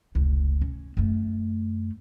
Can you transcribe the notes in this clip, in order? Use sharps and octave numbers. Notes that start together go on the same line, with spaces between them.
F1 C#2
C#4
F#2 A3